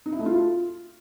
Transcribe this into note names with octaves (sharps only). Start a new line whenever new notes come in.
D#4
E4
A3
F4